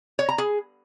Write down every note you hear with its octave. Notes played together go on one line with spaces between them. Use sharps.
C#5
A#5
G#4